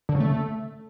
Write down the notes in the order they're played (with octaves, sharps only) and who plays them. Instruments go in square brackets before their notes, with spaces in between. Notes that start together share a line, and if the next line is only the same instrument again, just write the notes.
[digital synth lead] D3
C#3
A3